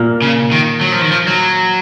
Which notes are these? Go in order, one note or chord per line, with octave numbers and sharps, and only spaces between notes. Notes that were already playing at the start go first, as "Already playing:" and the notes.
Already playing: A#2 A#3
C#3
D#3
F#3
F3
D#3
F3
F#3